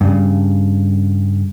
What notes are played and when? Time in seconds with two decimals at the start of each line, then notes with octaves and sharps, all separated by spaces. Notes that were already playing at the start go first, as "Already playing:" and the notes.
0.01 G2 C#3